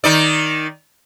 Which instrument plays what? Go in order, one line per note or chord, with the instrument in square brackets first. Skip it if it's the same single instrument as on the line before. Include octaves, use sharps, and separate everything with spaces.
[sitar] D#3 D#4 D5